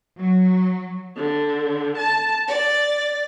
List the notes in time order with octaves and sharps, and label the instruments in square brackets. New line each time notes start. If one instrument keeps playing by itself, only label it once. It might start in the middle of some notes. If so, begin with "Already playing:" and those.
[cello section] F#3
[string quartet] D3
A5
D5